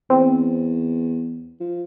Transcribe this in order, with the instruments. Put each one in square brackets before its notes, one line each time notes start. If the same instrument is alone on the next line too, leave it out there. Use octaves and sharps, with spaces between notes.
[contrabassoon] E2 [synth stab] C4
[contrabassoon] F3